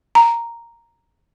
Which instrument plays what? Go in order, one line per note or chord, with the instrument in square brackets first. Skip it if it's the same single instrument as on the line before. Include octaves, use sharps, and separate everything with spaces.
[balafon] A#5